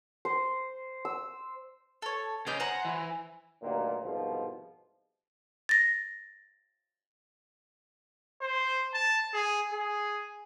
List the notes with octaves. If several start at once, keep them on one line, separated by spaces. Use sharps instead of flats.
C5
E6
A4 C#5
C#3 C#4 D5 D#5 G6
C5 F#5 G#5 A#5
E3
D2 G2 A#2 D#3 F#3 A#3
C2 G#2 B2 F3
A6 A#6
C5
A5
G#4
G#4